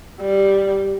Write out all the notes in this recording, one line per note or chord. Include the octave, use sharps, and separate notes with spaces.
G3